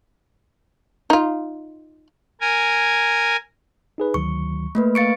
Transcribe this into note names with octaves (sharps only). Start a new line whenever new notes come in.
D#4 F4
A#4 G#5
D#4 G#4 B4
D2 D#3 F#3 C#6
A3 A#3 B4
F5 C#6 A6 C#7 D7